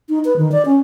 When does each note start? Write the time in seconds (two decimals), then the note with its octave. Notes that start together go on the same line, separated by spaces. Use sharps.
0.09 D#4
0.25 B4
0.37 D#3
0.52 D5
0.66 C#4